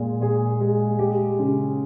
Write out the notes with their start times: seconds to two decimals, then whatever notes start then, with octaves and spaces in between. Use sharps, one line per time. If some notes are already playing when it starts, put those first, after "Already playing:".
Already playing: A#2 G#3
0.21 A#2 G#4
0.61 G#3
0.99 G#3 G4
1.39 C#3